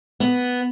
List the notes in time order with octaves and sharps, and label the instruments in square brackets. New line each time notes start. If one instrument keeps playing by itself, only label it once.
[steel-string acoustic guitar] B3